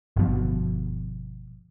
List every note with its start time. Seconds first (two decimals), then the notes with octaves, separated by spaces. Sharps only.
0.17 G1 B2 F3